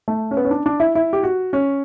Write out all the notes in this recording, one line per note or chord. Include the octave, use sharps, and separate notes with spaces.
A3
C#4
B3
C#4
D4
D4
E4
E4
G4
F#4
C#4